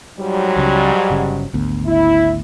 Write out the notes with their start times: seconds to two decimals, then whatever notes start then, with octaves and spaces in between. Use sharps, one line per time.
0.18 G#2 F#3 G3
0.56 C#2 C#3
1.10 G1 C#3
1.53 G#1 D2 B3
1.87 E4